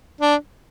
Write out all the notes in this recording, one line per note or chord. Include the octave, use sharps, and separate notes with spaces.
D4